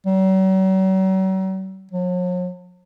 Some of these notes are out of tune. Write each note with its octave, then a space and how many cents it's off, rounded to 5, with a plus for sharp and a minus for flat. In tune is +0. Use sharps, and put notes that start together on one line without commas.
F#3 +45
F#3 -45